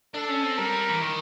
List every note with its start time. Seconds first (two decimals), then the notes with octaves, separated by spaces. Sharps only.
0.14 D4 A4
0.28 C#4
0.43 C4
0.57 G3 A#4
0.89 E3
1.01 D#3